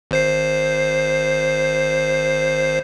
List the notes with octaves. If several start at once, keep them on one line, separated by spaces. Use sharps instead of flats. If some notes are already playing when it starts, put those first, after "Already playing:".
G#1 C5 C7